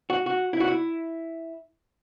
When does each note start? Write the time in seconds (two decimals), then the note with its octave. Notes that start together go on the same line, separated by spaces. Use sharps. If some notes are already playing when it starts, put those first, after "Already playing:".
0.10 F#4
0.26 F#4
0.53 E4
0.60 F#4
0.68 E4